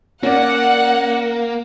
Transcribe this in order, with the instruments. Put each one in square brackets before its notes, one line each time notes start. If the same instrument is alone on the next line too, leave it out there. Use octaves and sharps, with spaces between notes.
[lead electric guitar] A#3 [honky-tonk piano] C#4 D5 [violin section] F#5